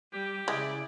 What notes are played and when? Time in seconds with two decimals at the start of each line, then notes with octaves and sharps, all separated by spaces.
0.13 G3 G4
0.48 C#3 G#3 E4 D5